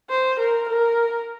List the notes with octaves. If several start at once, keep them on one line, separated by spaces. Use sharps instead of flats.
C5
A#4
A#4